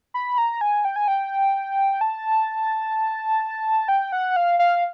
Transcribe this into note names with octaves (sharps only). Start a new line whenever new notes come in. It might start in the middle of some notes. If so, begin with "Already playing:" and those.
B5
A#5
G#5
G5
G#5
G5
A5
G5
F#5
F5
F5